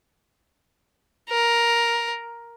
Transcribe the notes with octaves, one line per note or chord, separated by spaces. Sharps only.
A#4